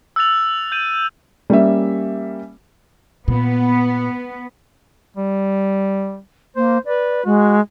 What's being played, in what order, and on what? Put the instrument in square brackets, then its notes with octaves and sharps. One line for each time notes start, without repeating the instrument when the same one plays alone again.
[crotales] E6 F#6 A6 F7
G6 D#7
[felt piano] G3 A#3 C#4 E5
[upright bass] A#2 [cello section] B3
[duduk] G3
[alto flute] A#3 [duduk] C5
[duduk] B4 [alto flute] D5
[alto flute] G#3 [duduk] F#4